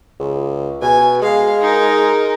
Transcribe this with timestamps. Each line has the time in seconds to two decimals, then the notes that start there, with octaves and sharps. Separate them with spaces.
0.20 C#2
0.82 B2 G#5
1.22 G#3 F5
1.61 D#4 A#4